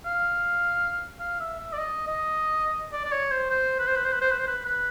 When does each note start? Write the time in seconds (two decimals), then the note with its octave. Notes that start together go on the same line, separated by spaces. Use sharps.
0.06 F5
1.20 F5
1.40 E5
1.59 E5
1.73 D5
1.78 D#5
2.07 D#5
2.92 D5
3.05 D5
3.12 C#5
3.31 C5
3.50 C5
3.79 B4
3.87 C5
3.96 B4
4.05 C5
4.13 B4
4.21 C5
4.31 B4
4.39 C5
4.47 B4
4.65 B4